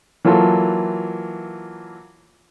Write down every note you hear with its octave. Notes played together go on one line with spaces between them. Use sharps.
E3 F#3 A#3 F4 A4